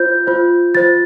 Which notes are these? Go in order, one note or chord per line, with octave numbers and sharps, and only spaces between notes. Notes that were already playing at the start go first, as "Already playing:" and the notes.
Already playing: F4 C5 G6
F4 C5
F4 C5 A6